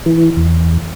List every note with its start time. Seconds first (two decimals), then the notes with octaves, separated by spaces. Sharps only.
0.06 E3
0.37 E2